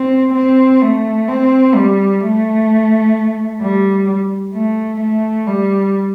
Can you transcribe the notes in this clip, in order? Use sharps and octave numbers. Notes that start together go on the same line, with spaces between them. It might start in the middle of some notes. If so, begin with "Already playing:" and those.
Already playing: C4
C4
A3
C4
G3
A3
G3
A3
A3
G3